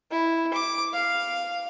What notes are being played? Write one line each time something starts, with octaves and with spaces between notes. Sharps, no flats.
E4
D6
F5